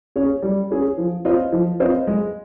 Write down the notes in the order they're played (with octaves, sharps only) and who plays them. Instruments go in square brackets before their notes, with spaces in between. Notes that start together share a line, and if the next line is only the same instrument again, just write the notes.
[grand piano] C#4 G#4 C#5
G3
C#4 G#4 C#5
F3
C4 F4 C5 D#5
F3
C4 F4 C5 D#5
G#3